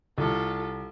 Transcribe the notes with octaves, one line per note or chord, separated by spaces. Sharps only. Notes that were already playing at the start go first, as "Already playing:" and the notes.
C2 F4 A4